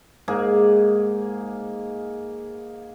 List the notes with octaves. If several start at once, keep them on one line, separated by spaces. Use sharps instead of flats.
G#2 A#3 G#4